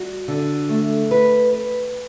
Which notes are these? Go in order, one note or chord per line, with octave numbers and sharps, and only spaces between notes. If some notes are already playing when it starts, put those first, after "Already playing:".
Already playing: G3 F#4
D3
A3
B4
B4